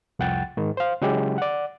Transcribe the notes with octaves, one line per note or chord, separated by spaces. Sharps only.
C2 F2 F#5 G5 A6
G#2 D#3
C5 F5
C#3 F#3 G#3 E4 G4
D5 F#5